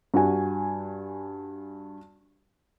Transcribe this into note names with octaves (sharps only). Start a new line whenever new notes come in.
G2 F#4 G#5